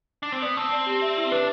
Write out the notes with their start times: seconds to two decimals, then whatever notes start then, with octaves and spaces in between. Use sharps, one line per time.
0.23 D4
0.32 C4
0.42 B3 D5
0.57 C4 A5
0.73 D5
0.86 G4
1.02 E5
1.17 E4
1.31 D4 B4